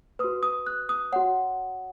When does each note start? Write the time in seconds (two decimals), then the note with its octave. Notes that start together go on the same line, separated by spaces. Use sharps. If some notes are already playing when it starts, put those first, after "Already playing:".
0.19 F#4 B4 D#6
0.43 D#6
0.67 F#6
0.89 D#6
1.12 F#4 C#5 F#5